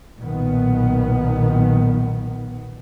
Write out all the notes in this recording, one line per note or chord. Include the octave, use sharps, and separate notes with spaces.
B1 A#2 D#3 B3